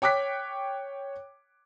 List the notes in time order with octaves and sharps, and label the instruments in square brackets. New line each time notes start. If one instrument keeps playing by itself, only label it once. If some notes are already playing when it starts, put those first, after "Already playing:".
[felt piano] C#5 G5 D6 F#6 B6